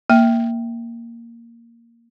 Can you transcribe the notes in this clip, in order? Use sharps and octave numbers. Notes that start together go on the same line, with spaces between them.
A#3 G5